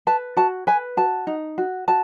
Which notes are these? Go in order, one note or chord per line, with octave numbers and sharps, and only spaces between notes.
B4 A5
F#4 A5
B4 G#5
F#4 A5
D#4
F#4
F#4 A5